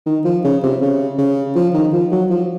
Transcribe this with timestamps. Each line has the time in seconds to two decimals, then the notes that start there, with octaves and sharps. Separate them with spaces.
0.06 D#3
0.25 F3
0.44 C#3
0.63 C3
0.81 C#3
1.18 C#3
1.55 F3
1.74 D#3
1.93 F3
2.12 F#3
2.30 F3